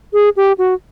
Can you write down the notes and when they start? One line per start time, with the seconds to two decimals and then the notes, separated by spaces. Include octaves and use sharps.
0.13 G#4
0.37 G4
0.58 F#4